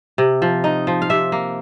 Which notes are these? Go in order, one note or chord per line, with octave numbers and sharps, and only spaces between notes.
C3
F3
D#4
F3
F5
C3 E5
A#3